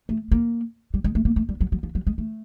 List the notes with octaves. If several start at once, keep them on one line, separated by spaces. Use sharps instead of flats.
A3
A#3
G3
G#3
A3
A#3
A3
G3
F#3
F#3
F3
F#3
G#3
A3